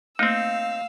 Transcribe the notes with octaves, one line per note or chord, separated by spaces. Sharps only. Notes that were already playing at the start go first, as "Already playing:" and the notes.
A3 A#3 C4 D#4 F5 E6